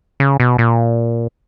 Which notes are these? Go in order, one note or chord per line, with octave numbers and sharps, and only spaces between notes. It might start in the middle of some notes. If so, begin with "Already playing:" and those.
C#3
B2
A#2